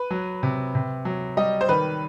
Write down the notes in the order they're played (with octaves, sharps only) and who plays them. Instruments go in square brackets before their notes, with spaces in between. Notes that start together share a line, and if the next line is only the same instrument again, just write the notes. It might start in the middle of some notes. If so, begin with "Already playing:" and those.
Already playing: [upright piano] B4
[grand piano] F#3
C3
C3
F#3
[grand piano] G3 [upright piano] D#5
[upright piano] C5
[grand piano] D#3 [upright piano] B4